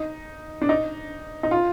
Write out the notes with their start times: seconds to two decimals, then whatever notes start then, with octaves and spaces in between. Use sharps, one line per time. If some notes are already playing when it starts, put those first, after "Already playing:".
Already playing: D#4
0.61 D4
0.69 D#4
1.43 D#4
1.51 F4